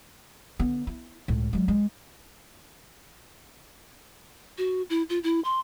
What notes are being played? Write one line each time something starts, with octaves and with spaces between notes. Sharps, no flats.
D3 B3
E4
C#2 A2
F#3 G#3
G#3
F#4
E4
F4
E4
C6